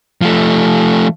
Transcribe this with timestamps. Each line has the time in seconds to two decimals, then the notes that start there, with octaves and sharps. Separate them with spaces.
0.22 F3 A3